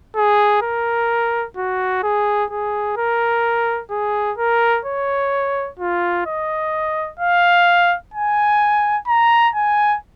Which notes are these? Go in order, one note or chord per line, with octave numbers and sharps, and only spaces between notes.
G#4
A#4
F#4
G#4
G#4
A#4
G#4
A#4
C#5
F4
D#5
F5
G#5
A#5
G#5